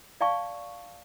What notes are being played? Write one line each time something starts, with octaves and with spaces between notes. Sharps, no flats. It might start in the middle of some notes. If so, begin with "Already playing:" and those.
D5 F5 G5 A5 C#6